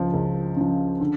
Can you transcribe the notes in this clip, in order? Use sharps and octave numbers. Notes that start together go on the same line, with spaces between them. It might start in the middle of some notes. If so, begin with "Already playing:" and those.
Already playing: C#2 C#3 F3
C#2
C#3 F3
D3